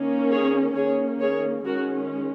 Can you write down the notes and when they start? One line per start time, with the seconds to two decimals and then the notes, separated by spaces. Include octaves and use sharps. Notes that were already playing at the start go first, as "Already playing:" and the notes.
Already playing: D#3 A#3 C#4
0.31 G#4 C#5
0.76 D#3 A#3 C#4 G#4 C#5
1.20 G#4 C#5
1.65 D#3 G#3 C#4 F#4 A#4